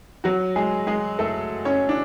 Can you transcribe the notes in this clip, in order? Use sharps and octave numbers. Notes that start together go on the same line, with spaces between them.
F#3 F#4
G#3 G#4
G#3 G#4
A3 A4
C#4 C#5
D4